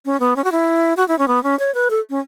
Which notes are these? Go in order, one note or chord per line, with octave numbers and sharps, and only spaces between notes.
C#4
B3
C#4
F#4
E4
F#4
E4
C#4
B3
C#4
C#5
B4
A4
C#4